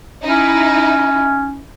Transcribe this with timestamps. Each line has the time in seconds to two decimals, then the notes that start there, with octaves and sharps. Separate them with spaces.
0.24 C#4 D#4 E4